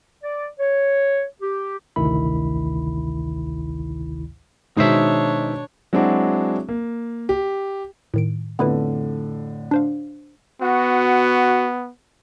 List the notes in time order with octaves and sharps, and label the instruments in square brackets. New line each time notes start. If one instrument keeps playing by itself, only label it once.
[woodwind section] D5
C#5
G4
[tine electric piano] A1 D2 C3 D#3 E4 B5
[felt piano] B2 D#3 G#3 [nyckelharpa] D4 C#5 [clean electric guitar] D#4 C5 E5
[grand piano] F#3 G#3 C4 D4 E4 F#4
A#3
G4
[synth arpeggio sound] A2 D#3 D7
[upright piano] F2 A2 D3 [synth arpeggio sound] B3 E4 B4
[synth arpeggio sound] D4 C5 F5
[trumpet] B3 [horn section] F#4